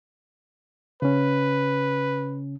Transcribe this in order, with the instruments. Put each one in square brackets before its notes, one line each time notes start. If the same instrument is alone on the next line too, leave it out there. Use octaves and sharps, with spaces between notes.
[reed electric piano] C#3 C#4 [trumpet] B4